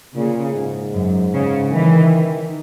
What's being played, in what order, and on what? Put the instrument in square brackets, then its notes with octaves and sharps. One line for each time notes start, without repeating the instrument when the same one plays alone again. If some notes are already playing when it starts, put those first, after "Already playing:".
[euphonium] A#2 [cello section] C#3
[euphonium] G#2
[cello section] F#2
C#3
[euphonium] D#3 [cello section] E3